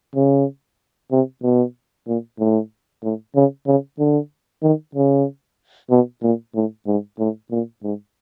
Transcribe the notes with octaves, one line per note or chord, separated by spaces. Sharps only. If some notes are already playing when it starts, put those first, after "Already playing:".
C#3
C3
B2
A#2
A2
A2
C#3
C#3
D3
D#3
C#3
B2
A#2
A2
G#2
A2
A#2
G#2